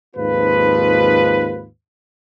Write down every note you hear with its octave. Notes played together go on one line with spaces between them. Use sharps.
D#2 G#2 F3 C4 F4 B4